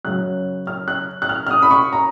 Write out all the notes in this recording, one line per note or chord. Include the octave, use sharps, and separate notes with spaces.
F#2 C#3 F#3 F#6
F6
F#6
F#6
F6
F6
D#6
B5
C#6
A#5